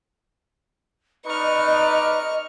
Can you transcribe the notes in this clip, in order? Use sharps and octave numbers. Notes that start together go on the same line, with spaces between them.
D#4 B4 D5 D#5 C#6 F6